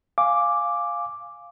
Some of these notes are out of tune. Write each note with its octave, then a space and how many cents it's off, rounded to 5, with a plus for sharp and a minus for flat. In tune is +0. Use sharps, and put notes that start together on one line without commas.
F5 +0 G#5 +0 D6 +0